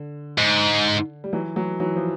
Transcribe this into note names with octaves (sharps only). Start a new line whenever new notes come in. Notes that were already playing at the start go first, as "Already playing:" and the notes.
Already playing: D3
G#2
G3
E3 F#3
E3 F#3
E3 F#3
F3